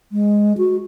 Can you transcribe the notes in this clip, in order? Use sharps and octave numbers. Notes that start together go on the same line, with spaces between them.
G#3
F#4